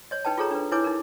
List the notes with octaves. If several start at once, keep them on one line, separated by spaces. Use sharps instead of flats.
C#5 D#5
D#4 B4 G5 A5
F4 G#4 A4 C#5 A#5
D4 B4
E4 B4 C#5 G#5 D6
D#4 A#4